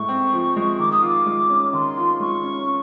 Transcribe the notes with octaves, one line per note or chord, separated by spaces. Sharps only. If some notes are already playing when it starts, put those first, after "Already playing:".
Already playing: A2 G#3 C#6
C4
F3
G#3
D#3 D6
D#6
F4 D6
G#3
C#4
D#3 C6
F4
G#3 C#6
C#4